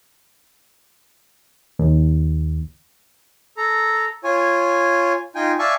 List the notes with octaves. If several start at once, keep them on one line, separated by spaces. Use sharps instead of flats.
D#2
A4 A#5
F4 C#5 G#5
D#4 F4 G5 G#5
D5 E5 F5 G#5 A5 C#6